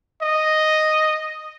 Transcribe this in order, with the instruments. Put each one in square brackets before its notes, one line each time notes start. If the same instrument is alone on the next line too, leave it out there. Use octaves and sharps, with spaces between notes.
[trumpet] D#5